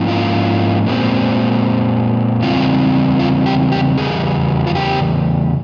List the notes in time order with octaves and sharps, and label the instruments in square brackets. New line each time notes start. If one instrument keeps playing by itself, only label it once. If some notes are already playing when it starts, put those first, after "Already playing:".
Already playing: [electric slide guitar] G#2 F3 A#3 C#4 E4
F4
A#2 G#3 C4
E2 C#3 G3 C4 F4
F4
G4
G4
E2 C#3 G3 G#4
F4
G4